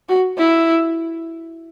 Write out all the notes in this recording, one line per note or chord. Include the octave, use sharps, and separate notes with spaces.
F#4
E4